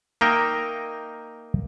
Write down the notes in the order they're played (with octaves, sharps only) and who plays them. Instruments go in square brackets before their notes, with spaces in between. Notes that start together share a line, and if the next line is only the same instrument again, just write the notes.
[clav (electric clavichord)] A#3 D#4 A#4 D#5 E5 G5